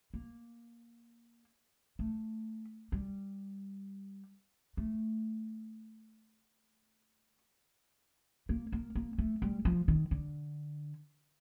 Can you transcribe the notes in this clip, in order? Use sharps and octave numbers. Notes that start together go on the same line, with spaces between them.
A#3
A3
G3
A3
A#3
A#3
A#3
A3
G3
F3
D#3
D3